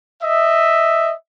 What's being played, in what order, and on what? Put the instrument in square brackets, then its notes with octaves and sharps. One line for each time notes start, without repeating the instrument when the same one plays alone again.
[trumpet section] D#5 E5